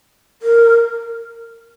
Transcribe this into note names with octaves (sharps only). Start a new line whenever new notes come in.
A#4